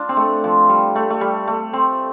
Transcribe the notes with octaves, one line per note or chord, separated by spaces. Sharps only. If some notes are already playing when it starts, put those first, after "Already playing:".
Already playing: D4 F4
C4
A3
F3
G3
A3
A3
G3
A3
C4